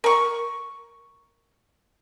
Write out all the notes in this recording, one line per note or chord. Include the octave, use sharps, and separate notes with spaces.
A#4 C#6